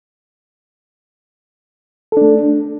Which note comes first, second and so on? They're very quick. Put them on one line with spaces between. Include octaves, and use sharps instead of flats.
A4 D4 A3